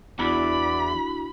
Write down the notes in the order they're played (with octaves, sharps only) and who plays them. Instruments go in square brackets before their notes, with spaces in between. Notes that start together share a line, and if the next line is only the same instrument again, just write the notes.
[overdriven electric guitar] E2 [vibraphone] D4 E4 F#4 [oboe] D5 [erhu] B5